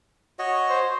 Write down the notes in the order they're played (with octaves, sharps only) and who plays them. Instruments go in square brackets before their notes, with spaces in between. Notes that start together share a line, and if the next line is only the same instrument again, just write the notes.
[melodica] F#4 C#5 D#5
[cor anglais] C5